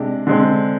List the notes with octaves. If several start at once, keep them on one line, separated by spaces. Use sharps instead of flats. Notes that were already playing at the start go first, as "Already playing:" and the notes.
Already playing: C3 G#3 D4
D3 G#3 C4